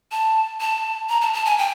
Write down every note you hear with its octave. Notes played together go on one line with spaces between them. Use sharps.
A5
A5
A#5
A5
A5
G#5
G5